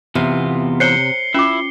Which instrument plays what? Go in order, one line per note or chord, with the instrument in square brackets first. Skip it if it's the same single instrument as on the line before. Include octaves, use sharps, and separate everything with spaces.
[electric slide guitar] E2 B3 F4 [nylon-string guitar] C3
[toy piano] C5 C#5 A#5 [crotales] C7 C#7 G7
[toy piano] C#4 F4 D6 [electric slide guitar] E4